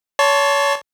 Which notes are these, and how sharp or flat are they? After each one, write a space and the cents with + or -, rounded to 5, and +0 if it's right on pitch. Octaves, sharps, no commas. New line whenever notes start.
C#5 +30 A5 +0 C6 +25